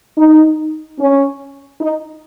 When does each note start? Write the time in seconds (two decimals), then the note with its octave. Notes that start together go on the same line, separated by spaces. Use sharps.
0.18 D#4
0.99 C#4
1.81 D#4